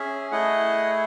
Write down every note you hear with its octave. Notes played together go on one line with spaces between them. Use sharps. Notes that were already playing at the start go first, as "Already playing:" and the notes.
Already playing: C#4 G#4 E5
A3 E4 G#4 D#5 F#5